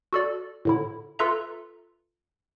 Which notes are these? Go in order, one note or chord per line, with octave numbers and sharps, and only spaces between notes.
F#4 A4 D5
A2 D3 E4
F4 A4 B4 E5 A#5